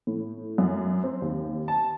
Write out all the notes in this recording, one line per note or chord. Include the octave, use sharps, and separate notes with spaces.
A2
F#2
C4
D#2
A5